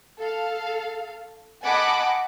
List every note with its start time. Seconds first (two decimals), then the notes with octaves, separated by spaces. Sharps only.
0.17 A4 F5
1.64 D#5 F#5 G#5 A5 B5 D6